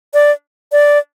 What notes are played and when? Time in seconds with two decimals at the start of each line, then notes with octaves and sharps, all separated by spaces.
0.14 D5
0.72 D5